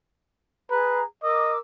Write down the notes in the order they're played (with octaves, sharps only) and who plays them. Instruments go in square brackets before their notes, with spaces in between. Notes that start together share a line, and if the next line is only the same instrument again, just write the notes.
[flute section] G#4 A#5 [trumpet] B4
[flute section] A#4 D6 E6 [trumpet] D#5